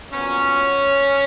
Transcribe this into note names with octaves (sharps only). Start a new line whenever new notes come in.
A#2 F#3 B3 C#4